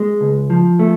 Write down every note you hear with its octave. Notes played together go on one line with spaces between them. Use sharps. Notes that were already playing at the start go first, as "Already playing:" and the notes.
Already playing: G#3
C#2
F3
A3